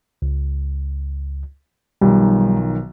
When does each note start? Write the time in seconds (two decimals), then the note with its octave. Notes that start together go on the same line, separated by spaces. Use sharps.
0.22 C#2
2.01 B1 D#3 F3 G3